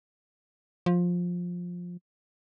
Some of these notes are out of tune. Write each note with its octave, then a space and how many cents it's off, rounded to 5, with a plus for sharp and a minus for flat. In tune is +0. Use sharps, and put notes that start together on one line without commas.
F3 +15